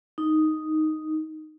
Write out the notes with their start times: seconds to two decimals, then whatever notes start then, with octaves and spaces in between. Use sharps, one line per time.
0.18 D#4